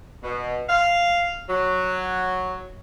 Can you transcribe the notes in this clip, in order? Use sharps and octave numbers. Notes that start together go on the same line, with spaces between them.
B2
F5
F#3